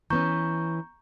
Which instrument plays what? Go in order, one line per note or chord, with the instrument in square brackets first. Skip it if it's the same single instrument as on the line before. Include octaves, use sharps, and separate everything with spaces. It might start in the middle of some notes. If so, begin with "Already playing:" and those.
[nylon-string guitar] E3 B3 C#4 [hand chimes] A#5 C#6 G6